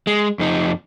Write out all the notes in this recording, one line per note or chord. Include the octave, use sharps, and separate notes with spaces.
G#3
F2 D#4